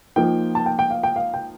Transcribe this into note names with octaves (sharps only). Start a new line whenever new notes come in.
F3 A#3 D#4 G5
A5
G5
G5
F5
G5
F5
G5